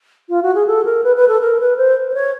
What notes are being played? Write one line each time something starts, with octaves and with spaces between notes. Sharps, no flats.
F4
F#4
G#4
A4
A#4
B4
B4
A4
A#4
B4
C5
C5
C#5